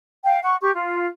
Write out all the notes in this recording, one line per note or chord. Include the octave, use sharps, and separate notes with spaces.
F5 G5
F#5 C#6
G4 C#6
F4